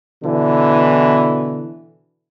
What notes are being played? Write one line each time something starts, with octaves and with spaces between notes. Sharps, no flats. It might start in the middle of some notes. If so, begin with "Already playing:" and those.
B2 D3 E3